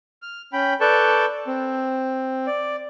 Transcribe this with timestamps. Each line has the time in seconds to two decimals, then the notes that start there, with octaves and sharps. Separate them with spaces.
0.22 F6
0.53 C#4 G5 B5
0.81 A4 B4 D5 A5 C#6 G6
1.47 C4
2.47 D5